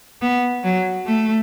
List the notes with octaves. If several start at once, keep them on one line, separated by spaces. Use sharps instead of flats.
B3
F#3
A3